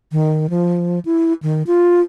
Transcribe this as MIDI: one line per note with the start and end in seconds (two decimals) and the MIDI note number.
0.12 0.50 51
0.50 0.99 53
1.05 1.33 64
1.43 1.63 51
1.67 2.01 65